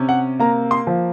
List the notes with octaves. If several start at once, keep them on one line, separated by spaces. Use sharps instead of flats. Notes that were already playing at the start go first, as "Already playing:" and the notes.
Already playing: C3 C#4
F#5
A#3 A#5
C6
F3